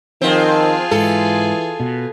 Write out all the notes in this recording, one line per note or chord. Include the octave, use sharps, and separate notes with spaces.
D#3 F3 C4 F4 G#4
G#2 E3 A4
B2